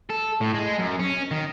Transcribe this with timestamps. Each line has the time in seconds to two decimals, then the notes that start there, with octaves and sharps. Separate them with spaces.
0.10 A4
0.41 A2
0.54 G#3
0.79 F#2
1.00 C#4
1.31 D#3